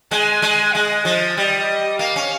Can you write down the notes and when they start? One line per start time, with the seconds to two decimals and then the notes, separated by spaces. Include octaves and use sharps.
0.11 G#3 G#5
0.42 G#3
0.74 G#3 D#5
1.05 F3 D#5
1.37 G3 D#5
1.99 A#3 F5
2.16 C#4